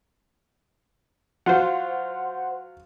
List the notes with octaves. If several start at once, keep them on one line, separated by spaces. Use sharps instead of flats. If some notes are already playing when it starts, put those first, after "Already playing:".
F#3 F4 C5 F#5